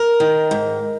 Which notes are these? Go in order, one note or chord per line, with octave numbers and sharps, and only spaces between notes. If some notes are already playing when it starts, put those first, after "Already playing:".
Already playing: A#4
D#3
G#2